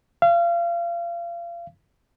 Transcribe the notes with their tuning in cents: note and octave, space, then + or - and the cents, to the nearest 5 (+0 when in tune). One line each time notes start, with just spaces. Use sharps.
F5 -30